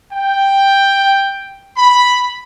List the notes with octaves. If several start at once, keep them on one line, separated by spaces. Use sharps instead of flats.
G5
B5